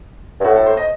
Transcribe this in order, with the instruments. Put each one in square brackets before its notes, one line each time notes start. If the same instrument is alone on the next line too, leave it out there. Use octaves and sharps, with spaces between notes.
[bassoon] G2
[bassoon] A2 [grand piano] F#4
[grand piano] A4
C5
D#5